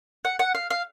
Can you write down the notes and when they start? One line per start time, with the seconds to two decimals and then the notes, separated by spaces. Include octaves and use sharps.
0.25 F#5
0.39 F#5
0.55 F5
0.70 F5